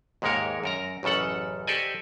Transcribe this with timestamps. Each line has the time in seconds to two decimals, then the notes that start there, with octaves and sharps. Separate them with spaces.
0.22 D#2 G#2 G#3 A#3 A#4 C#5
0.64 F#2 A#4 A#5
1.03 A1 F#2 C#3 A4 F#5
1.67 G4 A4 C5 D5 D#5 G#5